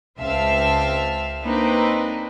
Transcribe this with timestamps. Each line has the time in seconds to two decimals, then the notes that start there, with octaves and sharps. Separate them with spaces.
0.18 C#2 C4 E5 F5 A5
1.43 A#3 C4 D4 D#4 B4